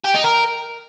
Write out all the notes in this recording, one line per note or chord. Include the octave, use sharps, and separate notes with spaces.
G4
D#4
A#4